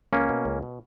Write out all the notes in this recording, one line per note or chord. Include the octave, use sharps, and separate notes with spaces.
C#2 A#3 C#4
B2
C#2
B2